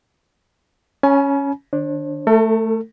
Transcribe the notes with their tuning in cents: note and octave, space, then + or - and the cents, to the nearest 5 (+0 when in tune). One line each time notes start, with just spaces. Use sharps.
C#4 +0 G#5 +35 B5 -45
D#3 -35 D4 +0 C5 +45
A3 +0 A4 +40